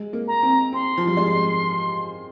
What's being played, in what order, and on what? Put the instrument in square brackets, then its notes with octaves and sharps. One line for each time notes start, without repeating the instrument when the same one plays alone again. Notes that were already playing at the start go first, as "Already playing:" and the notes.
Already playing: [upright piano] G#3
A#3
[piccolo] A#5
[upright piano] C4
[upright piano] C4 [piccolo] C6
[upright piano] F3
G3
G#3